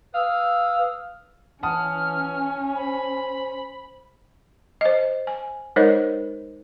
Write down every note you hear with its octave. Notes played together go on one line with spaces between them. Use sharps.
B4 F5 D#6 E6
E3 C#4 F#5 A5 D#6 F6
C5 B5
C5 D#5
G#5
G#3 D#4 A#4 C5 C#5 D#5